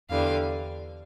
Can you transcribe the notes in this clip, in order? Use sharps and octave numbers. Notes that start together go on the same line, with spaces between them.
E2 D3 G3 F5